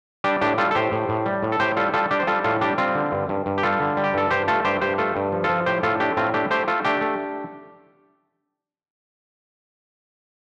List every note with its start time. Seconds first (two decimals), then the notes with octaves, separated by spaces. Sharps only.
0.24 G3 D4 G4
0.41 A2 D4 G4
0.58 G3 F4 A4
0.71 A4
0.75 A2 G4 C5
0.92 A2
1.09 A2
1.26 G3
1.43 A2
1.52 A4
1.60 A2 G4 C5
1.77 G3 F4 A4
1.94 G3 F4 A4
2.11 G3 D4 G4
2.20 C5
2.27 G3 F4 A4
2.44 A2 F4 A4
2.61 G3 D4 G4
2.78 G3 C4 F4
2.95 D3
3.12 G2
3.29 G2
3.46 G2
3.58 G4
3.63 G3 F4 A4
3.80 D3
3.97 G3
4.04 G4
4.14 G2 A4
4.30 G2 G4 C5
4.48 A3 F4 A4
4.65 G2 G4 C5
4.81 G2 G4 C5
4.98 A3 F4 A4
5.16 G2
5.32 F3
5.44 F4 A4
5.49 F3
5.66 A2 G4 C5
5.83 A2 F4 A4
6.00 A3 D4 G4
6.17 A2 C4 F4
6.34 A3 D4 G4
6.50 A3 G4 C5
6.68 A3 F4 A4
6.84 A3 D4 G4
7.01 A3